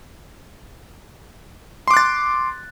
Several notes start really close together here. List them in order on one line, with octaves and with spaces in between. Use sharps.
C6 D6 F#6 A6